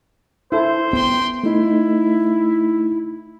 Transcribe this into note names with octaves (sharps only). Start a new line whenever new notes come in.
E4 A4 C5
B3 G5 C6
A3 D#4 E4